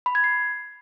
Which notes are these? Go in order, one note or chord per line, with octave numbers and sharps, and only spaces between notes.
B5
G#6
C7